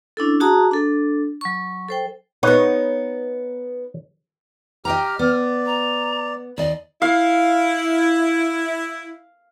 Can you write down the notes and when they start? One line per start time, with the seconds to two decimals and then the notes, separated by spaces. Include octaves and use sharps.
0.17 C#4 D4 E4 A4
0.40 F#4 G#4 F#5 A5 A#5 D#6
0.71 D4 A4
1.41 F#3 C#6
1.88 A4 C5 G5
2.43 B3 D#4 B4 C#5 F#5
4.85 G4 D#5 G5 A#5 F6
5.19 B3 D5
5.66 A#5
6.58 D#2 D5 D#5
7.02 E4 F5